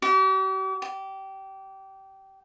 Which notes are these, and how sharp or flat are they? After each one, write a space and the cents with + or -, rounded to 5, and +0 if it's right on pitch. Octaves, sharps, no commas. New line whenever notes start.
G4 -45
G4 -20